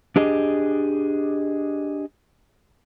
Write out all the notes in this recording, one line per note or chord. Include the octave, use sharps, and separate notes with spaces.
D4 G4 G#4 D#5